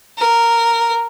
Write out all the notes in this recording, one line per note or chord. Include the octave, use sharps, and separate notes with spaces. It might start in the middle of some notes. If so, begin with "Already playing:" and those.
A#4